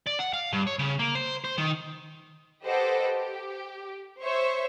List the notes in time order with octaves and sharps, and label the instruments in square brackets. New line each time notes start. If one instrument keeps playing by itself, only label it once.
[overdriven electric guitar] D5
F#5
F5
G2
C#5
C#3
A#3
C5
C5
D#3
[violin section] G4 A4 B4 C5 D#5 F#5
G4
C5 C#5 E5 C#6